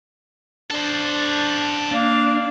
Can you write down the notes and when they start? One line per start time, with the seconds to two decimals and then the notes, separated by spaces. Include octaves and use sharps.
0.71 D4 A4 C5
1.92 A#3 D4 F5